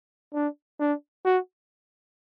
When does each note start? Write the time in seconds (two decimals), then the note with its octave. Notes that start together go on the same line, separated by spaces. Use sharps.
0.34 D4
0.80 D4
1.25 F#4